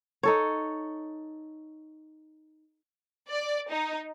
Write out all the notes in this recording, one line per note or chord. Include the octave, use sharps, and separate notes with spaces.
D#4 A4 C#5
D5
D#4